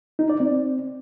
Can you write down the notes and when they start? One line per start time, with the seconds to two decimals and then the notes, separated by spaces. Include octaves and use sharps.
0.19 D#4
0.30 D5
0.40 C4